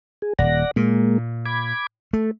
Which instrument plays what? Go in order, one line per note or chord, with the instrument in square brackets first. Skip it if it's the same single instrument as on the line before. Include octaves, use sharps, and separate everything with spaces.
[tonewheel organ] G#4
[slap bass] D#1 [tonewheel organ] D5 F#5 A#6
[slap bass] A#2 [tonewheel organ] G#3 A#3
[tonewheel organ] B5 D6 G#6
[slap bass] A3 [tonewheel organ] A4